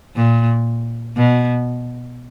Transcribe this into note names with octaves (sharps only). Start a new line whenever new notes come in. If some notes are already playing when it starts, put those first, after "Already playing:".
A#2
B2